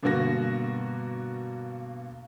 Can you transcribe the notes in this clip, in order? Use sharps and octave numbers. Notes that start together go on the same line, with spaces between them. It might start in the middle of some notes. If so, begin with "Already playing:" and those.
G2 B2 D3 A#3 F#4 A#6